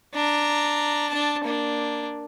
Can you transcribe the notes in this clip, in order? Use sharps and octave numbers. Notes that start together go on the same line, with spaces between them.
D4 A#5
D4 A5
A#3 D4